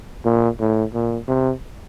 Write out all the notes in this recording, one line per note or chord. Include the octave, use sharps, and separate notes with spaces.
A#2
A2
A#2
C3